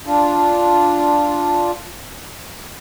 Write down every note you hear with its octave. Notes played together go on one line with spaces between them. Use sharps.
D4 F4